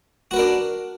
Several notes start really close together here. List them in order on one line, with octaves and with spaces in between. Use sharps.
F#4 B4 A#4 D4